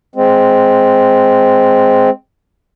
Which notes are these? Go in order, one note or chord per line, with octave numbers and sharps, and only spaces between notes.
G#3 C4